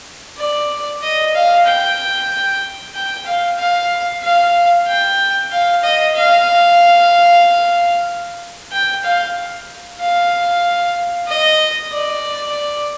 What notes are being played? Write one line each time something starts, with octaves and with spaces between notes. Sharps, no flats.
D5
D#5
F5
G5
G5
F5
F5
F5
G5
F5
D#5
F5
G5
F5
F5
D#5
D5